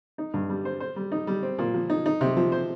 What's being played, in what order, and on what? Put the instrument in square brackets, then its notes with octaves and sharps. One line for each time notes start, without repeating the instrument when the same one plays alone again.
[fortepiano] D#4
G2
G3
C5
C5
G3
D#4
G3
C4
A#2
F3
D#4
D#4
C3
F3
C5